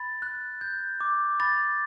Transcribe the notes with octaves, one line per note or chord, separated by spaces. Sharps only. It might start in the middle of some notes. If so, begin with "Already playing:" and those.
Already playing: B5 A6
F#6
G6
D6
B5 A6